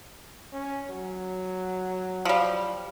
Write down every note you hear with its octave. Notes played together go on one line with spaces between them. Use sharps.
C#4
F#3
F3 G3